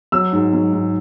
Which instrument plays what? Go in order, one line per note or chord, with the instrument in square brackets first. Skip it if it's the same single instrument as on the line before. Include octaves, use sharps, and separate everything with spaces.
[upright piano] F#3 E6
G#2
F#3
G#2